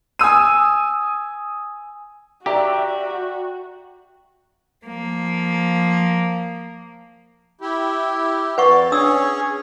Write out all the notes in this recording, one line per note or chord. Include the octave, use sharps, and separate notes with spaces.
G#5 D#6 E6 D#7
F#4 G4 D5 E5 G5 A#5 D6
F3 A#3
E4 G4
F2 B4 D5 F#5 C#6
C#4 D4 G#4 C#5 D#6 E6